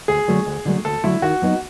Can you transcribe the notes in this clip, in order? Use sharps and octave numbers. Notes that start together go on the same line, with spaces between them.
D2 G#4
D3 F#3 A3
D2
D3 F#3 A3
D2 A4
D3 F#3 A3 E4
D#3 F#4
F#3 B3 D#4